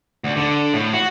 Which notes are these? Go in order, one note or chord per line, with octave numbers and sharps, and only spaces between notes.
D2
D3
A2
F#4